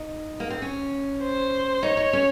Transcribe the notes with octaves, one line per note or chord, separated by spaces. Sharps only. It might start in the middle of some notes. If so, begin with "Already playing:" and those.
Already playing: D#4
A#3
C4
C#4
C5
D#4 C#5
D#4
C#4